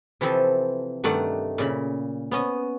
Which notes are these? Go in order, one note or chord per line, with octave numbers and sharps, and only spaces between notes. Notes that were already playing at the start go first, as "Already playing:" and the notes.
C3 E3 F3 C4 A4
G2 D#3 A3 D5 F#5
A#2 C#3 B5
B3 C#4 D#5